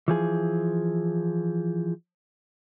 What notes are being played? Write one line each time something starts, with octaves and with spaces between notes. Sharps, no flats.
E3 F3 G#4